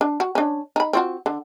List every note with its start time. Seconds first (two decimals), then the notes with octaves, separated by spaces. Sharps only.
0.01 D4
0.20 F#4
0.35 C#4 D4
0.76 D#4 B5
0.93 C4 F4 F#4
1.26 D3